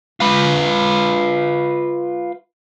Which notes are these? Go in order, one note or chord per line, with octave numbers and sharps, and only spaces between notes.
F4 B4